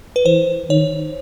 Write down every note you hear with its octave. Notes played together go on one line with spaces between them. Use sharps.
B4
E3 C5
D#3 C#5